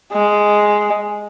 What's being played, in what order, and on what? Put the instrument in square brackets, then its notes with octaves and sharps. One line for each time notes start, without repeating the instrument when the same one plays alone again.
[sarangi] G#3